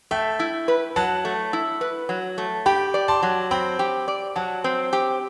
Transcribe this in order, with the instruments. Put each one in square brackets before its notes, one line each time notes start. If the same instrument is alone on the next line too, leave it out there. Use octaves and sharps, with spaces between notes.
[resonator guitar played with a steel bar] A3 [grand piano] E5 G5
[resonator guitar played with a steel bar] E4
B4
[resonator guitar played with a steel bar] F#3 [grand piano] F#5 A5
[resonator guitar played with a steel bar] A3
E4
B4
F#3
A3
[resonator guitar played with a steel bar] G4 [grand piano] G5 B5
[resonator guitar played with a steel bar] D5
[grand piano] A5 C6
[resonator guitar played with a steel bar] F#3
[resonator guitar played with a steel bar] C4 [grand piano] G5 B5
[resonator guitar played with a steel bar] G4
D5
[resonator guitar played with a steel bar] F#3 [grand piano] F#5 A5
[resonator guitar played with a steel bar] C4
G4